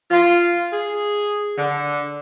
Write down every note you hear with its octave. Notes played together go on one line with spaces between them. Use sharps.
F4
G#4
D3